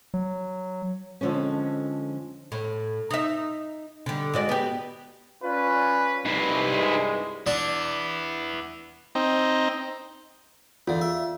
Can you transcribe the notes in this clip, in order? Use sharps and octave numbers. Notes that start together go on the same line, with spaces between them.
F#3
F2 D3 F3 G#3 C#4
A2
D#4 E5
D3 G3
G#2 F#4 D5
B3 G4
C#4 F4 B4 D5
C2 G2 G3 D#4 B4
G#3
B3 D4 E4
C4 D#4
E2 D3 F4
E5